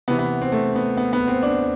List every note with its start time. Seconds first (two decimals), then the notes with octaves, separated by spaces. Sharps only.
0.08 C3 E3 B3
0.19 B3
0.42 C4
0.52 A3
0.76 B3
0.97 B3
1.13 B3
1.27 C4
1.43 D4